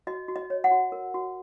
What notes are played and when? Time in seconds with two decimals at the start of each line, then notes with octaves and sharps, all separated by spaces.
0.07 F#4 D#5
0.28 F#4
0.36 D#5
0.50 C#5
0.64 F#5
0.71 F#4
0.92 A#4
1.14 F#4